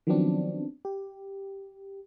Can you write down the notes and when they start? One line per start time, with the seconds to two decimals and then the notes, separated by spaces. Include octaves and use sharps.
0.07 D#3 F3 F#3 B3 C4 D4
0.85 G4